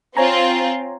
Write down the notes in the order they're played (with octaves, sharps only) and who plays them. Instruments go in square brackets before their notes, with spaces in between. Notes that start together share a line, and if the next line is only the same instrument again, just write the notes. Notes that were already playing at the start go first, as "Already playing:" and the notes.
[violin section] C4 F4 [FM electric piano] C#5 G#5 A#5